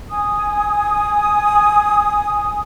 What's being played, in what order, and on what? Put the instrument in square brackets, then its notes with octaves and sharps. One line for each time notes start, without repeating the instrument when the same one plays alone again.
[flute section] G#5 D#6